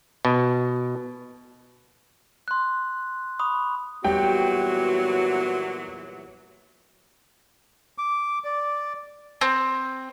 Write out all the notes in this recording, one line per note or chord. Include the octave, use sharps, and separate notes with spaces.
B2
C6 F#6
B5 C#6 D#6
A#2 E3 F#3 G3 B3 F#4 G4 G5
D6
D5
C4